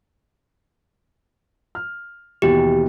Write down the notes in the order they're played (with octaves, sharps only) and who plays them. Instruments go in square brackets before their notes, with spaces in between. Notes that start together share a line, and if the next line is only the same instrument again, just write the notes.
[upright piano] F6
[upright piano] D#2 B2 E3 [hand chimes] G4